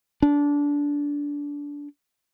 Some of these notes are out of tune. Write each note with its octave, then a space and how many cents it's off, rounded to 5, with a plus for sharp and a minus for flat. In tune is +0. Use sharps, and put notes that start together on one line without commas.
D4 -20